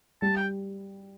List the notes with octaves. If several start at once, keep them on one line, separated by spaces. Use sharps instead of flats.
G3 A5
G5